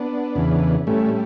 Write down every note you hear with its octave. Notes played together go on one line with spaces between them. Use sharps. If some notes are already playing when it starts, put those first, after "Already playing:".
Already playing: B3 D4
E2 C#3 E3
A2 G3 A3 C#4